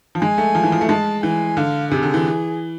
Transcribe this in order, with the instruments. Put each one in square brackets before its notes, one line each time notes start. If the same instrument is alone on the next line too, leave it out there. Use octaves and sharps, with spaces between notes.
[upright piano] F3
[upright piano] G#3 [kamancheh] G#5
[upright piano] A3
F3
E3
F3
A3
[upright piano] G#3 [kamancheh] A5
[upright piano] E3 [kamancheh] G#5
[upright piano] D3 [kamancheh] F5
[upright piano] C3 [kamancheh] G#4
[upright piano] D3
E3